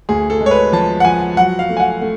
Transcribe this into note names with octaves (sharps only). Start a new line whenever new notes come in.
D2 G#4
A4
G#3
C#5
B4
F3 A5
F#5
F3 G#5
F#3 F#5
F5
A3
G#5
F#5
A3